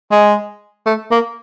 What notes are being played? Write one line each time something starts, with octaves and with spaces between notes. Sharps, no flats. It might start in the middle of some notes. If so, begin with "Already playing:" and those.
G#3
A3
A#3